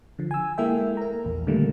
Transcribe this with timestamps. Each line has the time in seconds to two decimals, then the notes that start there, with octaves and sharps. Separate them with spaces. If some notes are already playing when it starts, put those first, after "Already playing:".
0.19 D3 F3
0.31 G#5 E6
0.58 G#3 A#3 E4 A4 E5 G5
0.97 A#4 A#5
1.25 A#1 E2
1.47 A#2 D3 D#3 G3 A3 A#3